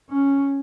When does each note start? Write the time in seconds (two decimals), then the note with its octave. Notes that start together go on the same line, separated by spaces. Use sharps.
0.10 C#4